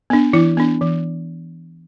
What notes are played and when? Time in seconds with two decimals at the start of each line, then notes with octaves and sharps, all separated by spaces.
0.10 B3 D4
0.33 E3 E4
0.57 B3 D4
0.81 E3